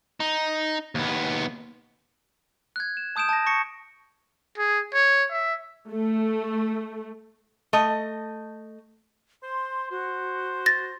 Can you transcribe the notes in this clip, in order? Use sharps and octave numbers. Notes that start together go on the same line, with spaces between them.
D#4
D#2 B3
F#6 G#6
E7
A5 D#6 G6 D7 E7
A5 A#6
C#6 A#6 C#7
G#4
C#5
E5
A3
A3 D#5
C5 C6
F#4 C5
A6 A#6